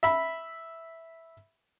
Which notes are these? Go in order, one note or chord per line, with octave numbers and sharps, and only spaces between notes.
E5 B5